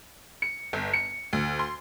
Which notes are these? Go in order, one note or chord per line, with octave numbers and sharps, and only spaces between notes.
C#7
G1
C#7
D2
C6